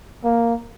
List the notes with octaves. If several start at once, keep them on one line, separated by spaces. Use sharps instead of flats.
A#3